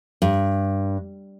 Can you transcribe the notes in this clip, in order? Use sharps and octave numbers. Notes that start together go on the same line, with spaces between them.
G2